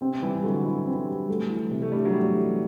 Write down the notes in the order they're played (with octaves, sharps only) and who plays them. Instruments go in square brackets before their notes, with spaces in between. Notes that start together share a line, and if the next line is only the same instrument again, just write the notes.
[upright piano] C3 [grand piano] C4
[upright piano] E3 [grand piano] G3
[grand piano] D3 [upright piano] F#3
[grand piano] E4
C4
G3
A3
E3
C3
[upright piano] A3
[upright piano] G3 [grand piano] D4
[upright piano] F#3
[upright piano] G3 [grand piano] A3
[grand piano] E3 [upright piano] G3